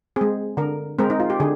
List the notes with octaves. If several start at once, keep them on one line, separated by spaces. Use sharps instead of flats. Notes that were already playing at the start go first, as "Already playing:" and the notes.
G#3 C4 G#4
D3 A#4
G#3 C4 A#4
D#4
F4
G4
D3 G#4